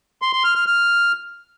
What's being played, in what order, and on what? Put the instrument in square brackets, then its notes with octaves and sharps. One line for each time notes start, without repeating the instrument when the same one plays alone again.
[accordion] C6
C6
F6
F6
F6